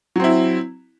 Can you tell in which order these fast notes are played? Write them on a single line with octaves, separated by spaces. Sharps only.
F#3 C4 E4